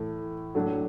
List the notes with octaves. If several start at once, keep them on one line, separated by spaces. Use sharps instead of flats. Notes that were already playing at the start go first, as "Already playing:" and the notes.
Already playing: A2 E3 A3
A2 F#3 A3 D4